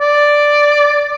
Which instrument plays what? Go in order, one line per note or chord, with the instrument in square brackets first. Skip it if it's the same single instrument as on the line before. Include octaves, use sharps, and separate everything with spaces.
[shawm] D5